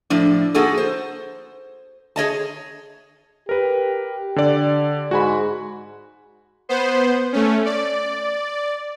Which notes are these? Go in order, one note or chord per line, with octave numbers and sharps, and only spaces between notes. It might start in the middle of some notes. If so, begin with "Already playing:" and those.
A2 F3 D4
A#3 D#4 F#4 G#4 A4
C5
G#4 C#5 D#5 A5
G4 A#4 B4
D3 D5
G#2 F#4 G#5 B5
B3 C5
A3 C#4
D5